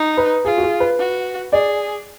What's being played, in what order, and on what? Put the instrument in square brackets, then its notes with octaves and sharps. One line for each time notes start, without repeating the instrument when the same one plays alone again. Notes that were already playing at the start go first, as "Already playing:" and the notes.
Already playing: [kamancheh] D#4
[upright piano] B4
[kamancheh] F4 [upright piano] G#4
[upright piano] F#4
G#4
B4
[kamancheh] F#4
[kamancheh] G#4 [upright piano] D5